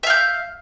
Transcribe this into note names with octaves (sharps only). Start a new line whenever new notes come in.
E5 F5 G6